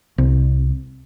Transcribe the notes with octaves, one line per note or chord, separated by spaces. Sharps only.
C2